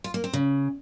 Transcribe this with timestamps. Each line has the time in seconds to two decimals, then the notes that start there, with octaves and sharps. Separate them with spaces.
0.04 F4
0.14 A#3
0.24 C4
0.33 C#3